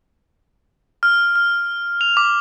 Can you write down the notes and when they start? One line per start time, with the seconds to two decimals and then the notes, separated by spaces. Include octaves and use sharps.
1.03 F6
1.36 F6
2.01 F7
2.17 D6